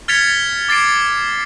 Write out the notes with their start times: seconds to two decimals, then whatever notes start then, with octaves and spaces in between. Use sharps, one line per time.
0.08 F6 G#6 A6 B6 C#7 F7
0.69 D6 A6 C7 D7